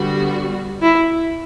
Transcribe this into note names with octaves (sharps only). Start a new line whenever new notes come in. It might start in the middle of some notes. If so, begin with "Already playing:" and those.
Already playing: D3 G3 B3 F#4
E4